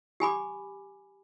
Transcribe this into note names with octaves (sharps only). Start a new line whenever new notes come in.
G4 G#5 B5 D6